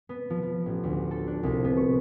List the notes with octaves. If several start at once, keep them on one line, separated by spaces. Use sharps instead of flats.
B3
F3
F3
A1
D2
A4
D4
C2
B3
C#6